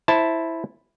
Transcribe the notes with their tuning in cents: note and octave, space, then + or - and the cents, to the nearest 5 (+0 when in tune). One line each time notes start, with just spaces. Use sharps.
E4 +0 C5 +0 A5 +0